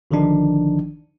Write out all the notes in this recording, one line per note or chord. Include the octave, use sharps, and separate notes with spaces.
G#1 D3 D#3 F3 D4 D#4